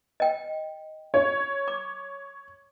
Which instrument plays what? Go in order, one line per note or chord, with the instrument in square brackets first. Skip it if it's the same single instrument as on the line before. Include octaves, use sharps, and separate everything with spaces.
[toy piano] D#5 G5
[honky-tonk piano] C#5
[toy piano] D6